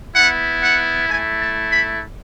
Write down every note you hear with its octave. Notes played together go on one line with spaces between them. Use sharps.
B3 E4 F#5
F#5
A3 E4 G#5
A5
B5